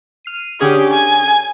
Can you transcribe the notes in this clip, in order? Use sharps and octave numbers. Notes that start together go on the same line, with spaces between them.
F6 C7 D#7
D3 C#4 G4 G#4
G#5